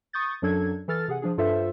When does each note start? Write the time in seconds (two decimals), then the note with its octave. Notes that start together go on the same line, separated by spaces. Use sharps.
0.13 C#6 D#6 G6 A6
0.42 F#2 F#3 D4 A4 G#6
0.88 E3 A4 F6 A6
1.08 C3 G#4 F#5
1.22 F3 D4 G#4
1.38 G2 F4 A4 C5 E5